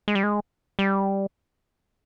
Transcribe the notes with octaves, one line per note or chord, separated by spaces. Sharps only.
G#3
G3
G#3
G3